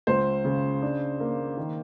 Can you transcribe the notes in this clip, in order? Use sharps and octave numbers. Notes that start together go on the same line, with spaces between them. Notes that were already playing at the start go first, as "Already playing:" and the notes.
C#2 C5
C#3
D4
A#3
D#3